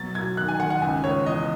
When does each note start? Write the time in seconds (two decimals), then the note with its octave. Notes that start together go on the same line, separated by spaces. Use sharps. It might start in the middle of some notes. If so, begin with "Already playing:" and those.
Already playing: B2 F#3 A6
0.15 F#3 G#6
0.37 D#3 F#6
0.48 G#5
0.59 D#3 F#5
0.70 F#5
0.82 C#2 G#5
1.04 C#2 C#5
1.26 E2 D#5